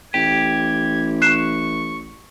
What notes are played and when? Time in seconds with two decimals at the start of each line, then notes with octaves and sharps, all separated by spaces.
0.14 A1 G4 G#6
1.22 C#6 F#6 C7 E7